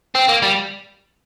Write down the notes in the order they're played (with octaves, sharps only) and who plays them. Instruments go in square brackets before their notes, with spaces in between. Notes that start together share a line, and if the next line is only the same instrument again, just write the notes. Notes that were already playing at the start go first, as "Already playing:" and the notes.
[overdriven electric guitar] C4
A#3
G3